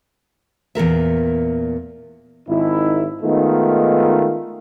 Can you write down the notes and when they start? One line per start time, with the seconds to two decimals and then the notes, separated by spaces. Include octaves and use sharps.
0.75 E2 A#2 A#4 E5
2.49 G#1 D#4 E4
3.22 D#3 G#3 A3 B3 D#4 F4